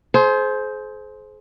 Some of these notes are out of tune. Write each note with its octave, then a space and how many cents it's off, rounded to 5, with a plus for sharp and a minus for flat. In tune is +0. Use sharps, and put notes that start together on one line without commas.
G#4 +40 C5 +0